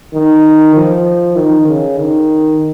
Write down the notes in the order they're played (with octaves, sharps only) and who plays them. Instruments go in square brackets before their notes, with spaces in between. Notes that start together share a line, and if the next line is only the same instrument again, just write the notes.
[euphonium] D#3
F3
D#3
C#3
D#3